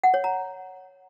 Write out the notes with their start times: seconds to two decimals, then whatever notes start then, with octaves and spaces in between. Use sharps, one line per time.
0.04 F#5
0.14 C#5
0.24 A#5